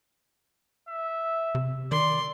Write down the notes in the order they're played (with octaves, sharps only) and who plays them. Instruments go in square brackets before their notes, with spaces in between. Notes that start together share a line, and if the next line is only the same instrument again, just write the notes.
[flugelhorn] E5
[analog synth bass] C3
[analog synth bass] D#3 [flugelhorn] D5 [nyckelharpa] C6